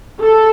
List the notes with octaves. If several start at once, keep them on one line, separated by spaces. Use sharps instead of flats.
A4